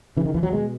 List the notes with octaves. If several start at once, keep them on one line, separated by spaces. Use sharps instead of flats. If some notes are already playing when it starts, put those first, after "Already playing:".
C#3 E3
D#3
D#2 E3
F#3
B2 G#3